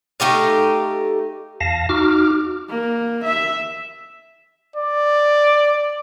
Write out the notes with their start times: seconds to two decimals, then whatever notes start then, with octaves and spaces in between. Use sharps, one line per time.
0.20 A3 D#4 G4 F5
1.60 E2 F5 A5 A#6
1.89 D#4 F#4 D6 F6
2.69 A#3
3.25 E5
4.76 D5